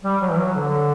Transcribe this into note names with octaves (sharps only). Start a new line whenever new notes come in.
G3
F#3
E3
F#3
D3